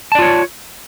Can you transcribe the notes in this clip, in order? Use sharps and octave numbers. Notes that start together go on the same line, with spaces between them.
F4 C#5 D5 A5